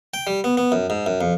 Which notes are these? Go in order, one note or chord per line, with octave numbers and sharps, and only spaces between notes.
G5
G3
B3
B3
F#2
G#2
F#2
F2